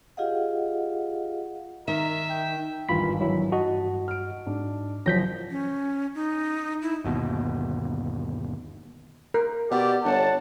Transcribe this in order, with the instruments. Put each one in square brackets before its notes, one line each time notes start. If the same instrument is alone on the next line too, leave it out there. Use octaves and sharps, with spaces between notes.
[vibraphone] F4 G4 G#4 D#5 F5 F#5
[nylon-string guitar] D#3 [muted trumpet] A#4 [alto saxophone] E5
[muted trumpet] G5
[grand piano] G#1 E2 G2 [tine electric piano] F4 B5 B6
[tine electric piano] F#3 E4
[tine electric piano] G2 F#4 D#5 [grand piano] A5
[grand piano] F6 D7
[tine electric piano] G#2 [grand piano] D4
[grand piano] F#1 F3 A#6 [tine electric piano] F#3 G6 B6
[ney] C#4
D#4
E4
[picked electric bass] G1 D#2 B2
[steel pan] A#4
[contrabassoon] B2 [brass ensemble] G4 D5
[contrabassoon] G1 [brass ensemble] C#5 F#5 A5